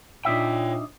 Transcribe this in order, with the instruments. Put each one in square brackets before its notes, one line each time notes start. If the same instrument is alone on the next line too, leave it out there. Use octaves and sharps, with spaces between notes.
[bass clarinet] A#2 [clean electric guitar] D4 D#4 E5 [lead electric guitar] C#5 G5